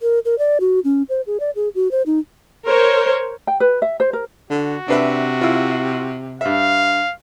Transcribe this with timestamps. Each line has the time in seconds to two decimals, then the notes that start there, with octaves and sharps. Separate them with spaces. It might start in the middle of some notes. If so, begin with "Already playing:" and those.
0.01 A#4
0.25 A#4
0.39 D5
0.60 F#4
0.84 C#4
1.09 C5
1.27 G#4
1.40 D5
1.56 G#4
1.75 F#4
1.91 C5
2.06 D#4
2.65 A#4 C5 C#5
3.47 G5
3.60 B4
3.82 E5
4.00 C5
4.13 A#4
4.50 D3 F#4
4.88 C3 D4 B4 E5
5.41 E4 F4
6.41 G2 E5 F5